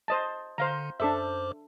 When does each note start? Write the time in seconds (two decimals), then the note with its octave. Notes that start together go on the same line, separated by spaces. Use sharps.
0.08 C5 D#5 A5
0.58 D3 C5 F5 A#5
1.00 F#2 D4 A4 C5 E5 D6